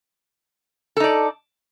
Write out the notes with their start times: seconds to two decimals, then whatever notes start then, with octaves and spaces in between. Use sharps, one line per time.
0.97 A4
1.00 D#4
1.04 D5